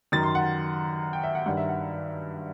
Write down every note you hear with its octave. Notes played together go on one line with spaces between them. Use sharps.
F#2 D#3 A6
C6
F#5
G5
E5
F#5
G2 D#3 F#5
E5
F#5